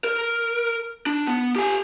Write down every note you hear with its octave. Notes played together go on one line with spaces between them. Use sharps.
A#4
D4
B3
G4 G#5